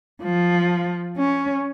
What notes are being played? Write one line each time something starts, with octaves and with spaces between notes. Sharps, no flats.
F3
C#4